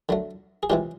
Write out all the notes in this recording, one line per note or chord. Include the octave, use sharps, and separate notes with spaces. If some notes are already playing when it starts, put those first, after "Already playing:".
D3 F#3 A3
G#4
C3 E3 G#3 C#4 F4 G4